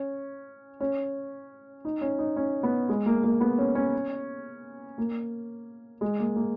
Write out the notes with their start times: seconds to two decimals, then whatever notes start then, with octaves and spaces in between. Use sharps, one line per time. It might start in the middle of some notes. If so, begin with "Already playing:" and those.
Already playing: C#4
0.80 C#4
1.85 D#4
2.01 C#4
2.19 D#4
2.36 C#4
2.63 B3
2.89 G#3
3.06 A#3
3.24 A#3
3.40 B3
3.58 C#4
3.75 C#4
4.98 A#3
6.01 G#3
6.19 A#3
6.36 A#3